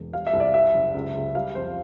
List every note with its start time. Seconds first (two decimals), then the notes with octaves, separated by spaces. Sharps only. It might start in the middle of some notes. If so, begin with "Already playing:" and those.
Already playing: E1
0.13 G3 F5
0.27 E5
0.33 C2
0.40 D5
0.54 G3 E5
0.74 F#1
0.95 C#2
1.15 C#2
1.35 G3 F5
1.55 F2 C5